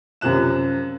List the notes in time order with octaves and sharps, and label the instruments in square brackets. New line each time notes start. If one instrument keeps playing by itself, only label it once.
[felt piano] F#2 C3 F3 F#6 E7